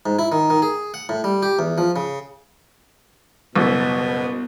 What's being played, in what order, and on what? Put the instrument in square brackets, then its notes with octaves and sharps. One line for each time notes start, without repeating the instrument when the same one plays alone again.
[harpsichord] G#2
E4
D#3
D#3
G#4
F#5
A2
G3
G4
E2
F3
C#3
[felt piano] F#1 B4 A6 [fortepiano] C2 [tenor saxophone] B2 [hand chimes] B3 B6